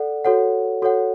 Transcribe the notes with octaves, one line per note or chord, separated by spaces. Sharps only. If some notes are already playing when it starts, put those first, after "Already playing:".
Already playing: A4 D5 F#5
F#4 A4 C#5 F#5
F#4 A4 C#5 F#5